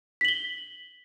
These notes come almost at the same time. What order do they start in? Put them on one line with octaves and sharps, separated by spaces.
B6 F#7 G7